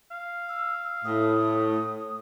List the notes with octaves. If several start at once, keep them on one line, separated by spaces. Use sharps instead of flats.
F5
E6
A2 D#6